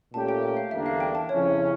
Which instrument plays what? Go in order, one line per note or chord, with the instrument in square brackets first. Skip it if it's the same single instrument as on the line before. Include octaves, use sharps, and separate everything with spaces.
[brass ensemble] A#2 A3 C#4 G4 A#4 [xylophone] A5
[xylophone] G5
E5
F5
[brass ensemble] E2 D3 G3 A#3 D4 [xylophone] E5
[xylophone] F5
G5
A5
[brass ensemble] F2 C#3 F3 C#4 E4 [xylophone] C#5